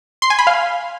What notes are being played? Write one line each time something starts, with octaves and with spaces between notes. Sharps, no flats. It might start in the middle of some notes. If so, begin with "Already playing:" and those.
C6
G#5
B5
F5